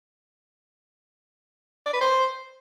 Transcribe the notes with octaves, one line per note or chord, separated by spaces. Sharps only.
D5
B4
C5